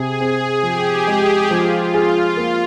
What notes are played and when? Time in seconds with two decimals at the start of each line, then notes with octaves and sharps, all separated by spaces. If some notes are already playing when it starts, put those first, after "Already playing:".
Already playing: C3 G#4
0.20 C4 G#4
0.63 F3 G4
1.07 G#3
1.50 F3 F4
1.94 G#4
2.37 A#3